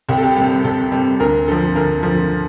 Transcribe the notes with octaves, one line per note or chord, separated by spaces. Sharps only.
C2 G4
A4
G4
C3 G3 G4
C2 A4
C3 G3
D2 A#4
D3 F3 A4
D2 A#4
D3 F3